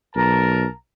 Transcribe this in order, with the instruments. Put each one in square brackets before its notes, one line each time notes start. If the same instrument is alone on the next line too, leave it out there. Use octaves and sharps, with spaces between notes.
[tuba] B1 [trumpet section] A#4 A5 A#5